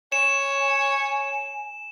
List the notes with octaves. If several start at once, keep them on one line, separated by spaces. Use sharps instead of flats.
C#5 G#5 E7